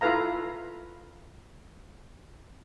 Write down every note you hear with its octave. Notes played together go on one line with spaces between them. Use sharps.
E4 F4 A4 B4 F5 A#5